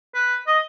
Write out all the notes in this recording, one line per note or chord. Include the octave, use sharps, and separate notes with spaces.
B4
D#5